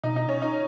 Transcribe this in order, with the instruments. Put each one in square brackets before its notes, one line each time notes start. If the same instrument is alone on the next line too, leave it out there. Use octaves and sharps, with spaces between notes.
[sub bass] B2 [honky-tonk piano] D#4
[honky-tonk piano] D#4
C#4
D#4